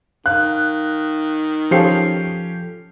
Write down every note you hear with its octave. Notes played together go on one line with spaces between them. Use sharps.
D#3 F5 F#6
F3 C#4 F4 G4 A4 C7